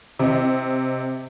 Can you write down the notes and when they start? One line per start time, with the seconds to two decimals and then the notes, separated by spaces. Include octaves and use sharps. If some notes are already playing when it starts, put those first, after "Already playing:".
0.19 C3 D#5